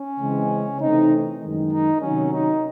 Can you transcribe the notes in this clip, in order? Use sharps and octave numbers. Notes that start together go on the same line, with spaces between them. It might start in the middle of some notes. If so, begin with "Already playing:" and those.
Already playing: C#4
C#3 E3 G#3 C4
C3 E3 A3 C4 D#4
F#2 D#3 G#3
D#4
C3 D#3 F#3 C#4
D#4